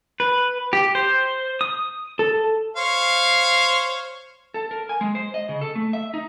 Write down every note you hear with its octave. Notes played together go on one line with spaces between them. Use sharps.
B4
G4
C5
D#6
A4
C5 C#5 F5
A4
A#4
G#5
G#3
C5
D#5
C#3
A4
A3
E5
D#4